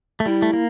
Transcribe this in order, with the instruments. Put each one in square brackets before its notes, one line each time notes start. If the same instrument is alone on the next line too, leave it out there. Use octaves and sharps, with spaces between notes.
[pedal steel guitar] A3
[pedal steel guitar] G3 [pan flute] E4
[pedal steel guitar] A3
A#3